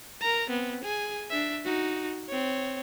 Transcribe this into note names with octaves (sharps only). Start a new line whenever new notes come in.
A#4 A#5
B3 C4
G#4 G#5
D4 E5
D#4 F#4
C4 C#5